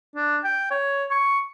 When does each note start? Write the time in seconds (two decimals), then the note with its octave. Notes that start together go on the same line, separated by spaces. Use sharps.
0.16 D4
0.44 G5
0.71 C#5
1.11 C#6